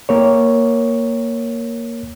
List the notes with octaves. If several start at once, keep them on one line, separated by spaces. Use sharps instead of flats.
A#3 A#4 C#5